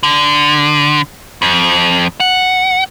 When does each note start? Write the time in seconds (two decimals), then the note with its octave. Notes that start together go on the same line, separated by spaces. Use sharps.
0.03 D3
1.42 F2
2.20 F#5